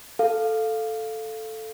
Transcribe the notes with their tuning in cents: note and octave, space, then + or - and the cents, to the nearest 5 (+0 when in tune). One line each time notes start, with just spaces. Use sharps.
A4 +0 F5 +0